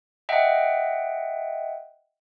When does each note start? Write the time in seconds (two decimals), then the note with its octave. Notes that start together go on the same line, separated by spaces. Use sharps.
0.29 D#5 E5 F#5 G5